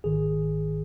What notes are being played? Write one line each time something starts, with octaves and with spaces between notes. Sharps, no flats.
G#1 G#2 D#3 G#4